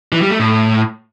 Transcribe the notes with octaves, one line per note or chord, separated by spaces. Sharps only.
E3
G3
A3
A2